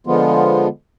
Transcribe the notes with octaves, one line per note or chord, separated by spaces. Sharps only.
D3 F3 G#3 B3 F4